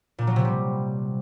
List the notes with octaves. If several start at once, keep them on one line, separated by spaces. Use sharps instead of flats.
A#2
F#3
C3
G3